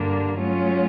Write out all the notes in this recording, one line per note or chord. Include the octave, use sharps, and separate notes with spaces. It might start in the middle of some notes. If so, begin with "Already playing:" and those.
Already playing: G2 D3 G3 A#3 D4
F#3 A3 C#4 F4